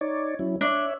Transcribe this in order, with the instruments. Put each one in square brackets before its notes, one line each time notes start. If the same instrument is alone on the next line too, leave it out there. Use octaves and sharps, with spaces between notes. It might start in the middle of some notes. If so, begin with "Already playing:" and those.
[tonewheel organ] D#4 C#5 D5
F#3 C#4 E4
[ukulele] D4 [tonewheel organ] C#5 E5